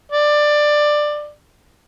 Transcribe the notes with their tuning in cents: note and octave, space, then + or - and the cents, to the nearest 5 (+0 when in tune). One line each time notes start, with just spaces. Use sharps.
D5 +15